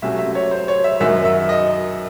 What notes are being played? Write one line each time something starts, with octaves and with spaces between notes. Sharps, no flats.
C3 F#3 A3 C#4 E5
E5
C#5
C5
C#5
E5
F#2 D#3 F#3 E5
E5
D#5